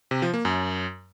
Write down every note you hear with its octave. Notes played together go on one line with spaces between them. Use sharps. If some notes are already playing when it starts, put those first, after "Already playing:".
C3
F3
A#3
F#2